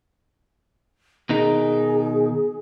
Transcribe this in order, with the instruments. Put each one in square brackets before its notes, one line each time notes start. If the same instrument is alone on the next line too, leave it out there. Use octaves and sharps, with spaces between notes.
[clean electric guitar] B2 D#3 D#4 [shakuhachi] G#4